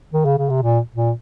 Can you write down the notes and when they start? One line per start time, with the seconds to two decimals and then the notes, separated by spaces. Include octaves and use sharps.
0.13 D#3
0.25 C#3
0.38 C#3
0.50 C3
0.62 A#2
0.95 A#2